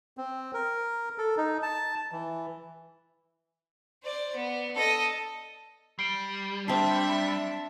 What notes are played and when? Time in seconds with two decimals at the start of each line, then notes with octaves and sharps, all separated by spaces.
0.17 C4
0.54 A#4
1.18 A4
1.38 D#4
1.63 A5
2.12 E3
4.04 C5 D5
4.36 B3
4.75 A4 D#5
5.99 G3 C7 D7
6.68 C4 D4 E5 A5 C6